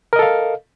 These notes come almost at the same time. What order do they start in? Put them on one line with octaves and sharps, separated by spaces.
A#4 D#5 A4 F5